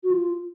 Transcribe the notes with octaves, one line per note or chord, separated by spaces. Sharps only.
F#4
F4